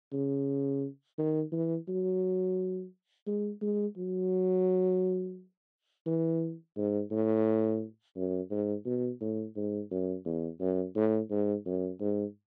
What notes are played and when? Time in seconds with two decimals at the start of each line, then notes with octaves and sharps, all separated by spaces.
0.13 C#3
1.19 D#3
1.52 E3
1.88 F#3
3.27 G#3
3.62 G#3
3.98 F#3
6.06 E3
6.77 G#2
7.11 A2
8.17 F#2
8.51 G#2
8.86 B2
9.21 A2
9.56 G#2
9.91 F#2
10.25 E2
10.61 F#2
10.96 A2
11.30 G#2
11.66 F#2
12.01 G#2